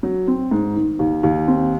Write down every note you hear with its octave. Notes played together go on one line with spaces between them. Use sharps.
F#3
C4
G#2
D#3
D#2
D#2
C4